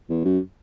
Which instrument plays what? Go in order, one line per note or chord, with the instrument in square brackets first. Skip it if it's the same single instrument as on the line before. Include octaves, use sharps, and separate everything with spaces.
[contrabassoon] E2
F#2